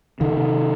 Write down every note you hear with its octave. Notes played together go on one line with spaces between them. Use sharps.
C3 D#3
C3